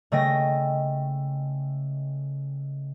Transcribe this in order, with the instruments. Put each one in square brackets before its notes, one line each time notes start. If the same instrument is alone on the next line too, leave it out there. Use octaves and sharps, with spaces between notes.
[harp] C#3 A3 D#5 G5 A#6